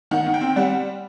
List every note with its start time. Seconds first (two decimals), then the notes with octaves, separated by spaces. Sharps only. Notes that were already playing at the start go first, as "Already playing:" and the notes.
0.11 D#3 F#5
0.26 D#3
0.34 G5
0.41 C4
0.56 G3 F#5